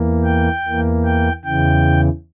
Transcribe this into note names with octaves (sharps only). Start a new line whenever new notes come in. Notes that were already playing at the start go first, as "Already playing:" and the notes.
Already playing: E2 E3 A#3
G5
E2 E3 A#3
G5
E2 C#3 E3 G5